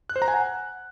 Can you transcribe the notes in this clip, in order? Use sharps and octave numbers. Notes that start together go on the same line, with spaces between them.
F#6
C5
A#5
G#5
F#5